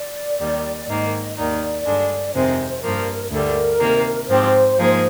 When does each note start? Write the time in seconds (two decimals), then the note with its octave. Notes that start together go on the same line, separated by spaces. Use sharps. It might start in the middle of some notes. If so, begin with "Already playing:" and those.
Already playing: D5
0.39 D#2 D#3 G3
0.88 G#2 D#3 A#3 D#5
1.36 D#2 D#3 A#3 D#4 D5
1.85 G2 D3 G#3 D4
2.34 F2 C3 D#3 G#3 C4 C5
2.82 G2 F3 A#3 A#4
3.30 D2 D3 G3 A#4
3.80 C3 D#3 A#3
4.28 G#2 F3 C4 G4 C5
4.77 G#2 F3 A#3 D#4 G#4